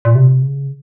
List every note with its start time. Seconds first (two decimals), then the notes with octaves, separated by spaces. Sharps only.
0.05 A#2
0.15 C3
0.42 C#3